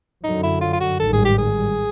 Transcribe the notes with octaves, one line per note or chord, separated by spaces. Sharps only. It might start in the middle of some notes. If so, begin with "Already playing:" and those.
F#2 D3 F#3 D#4
E4
F4
F4
F#4
A1 G#2 D#3 G3 A4
G#4
G4
G#4